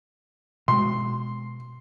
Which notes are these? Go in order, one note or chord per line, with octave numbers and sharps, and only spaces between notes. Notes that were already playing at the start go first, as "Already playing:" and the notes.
B2 G#3 C6